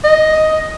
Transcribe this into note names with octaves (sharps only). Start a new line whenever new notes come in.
D#5